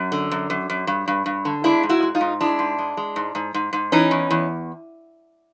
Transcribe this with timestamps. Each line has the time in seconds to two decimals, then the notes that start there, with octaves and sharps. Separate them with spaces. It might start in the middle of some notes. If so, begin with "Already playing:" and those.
Already playing: F#2
0.12 D3
0.31 F#2
0.50 F#2
0.70 F#2
0.87 G2
1.08 G2
1.26 G2
1.45 D3
1.64 G#3 D4 E4
1.83 G#2
1.89 E4 F#4
2.02 G#3
2.15 D#4 F4
2.21 G#2
2.40 G#3 D4 E4
2.59 G#2
2.78 G#3
2.97 G#3
3.16 G#2
3.35 G#2
3.54 G#2
3.73 G#2
3.92 E3 C#4 D#4
4.11 E2
4.31 E2